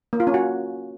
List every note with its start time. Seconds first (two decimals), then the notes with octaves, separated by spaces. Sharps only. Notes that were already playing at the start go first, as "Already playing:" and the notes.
0.13 A#3
0.20 F4
0.27 C#4
0.34 F#4